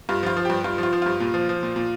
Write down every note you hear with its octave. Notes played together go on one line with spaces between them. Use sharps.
G2 F4
F3 F4
F3
G2 G4
G2 F4
F3 F4
F3
G2 F4
A#2
F3
F3
A#2
A#2